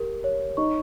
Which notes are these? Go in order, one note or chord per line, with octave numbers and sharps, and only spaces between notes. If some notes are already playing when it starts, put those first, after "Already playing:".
Already playing: G4 A#4
C#5
D#4 C#6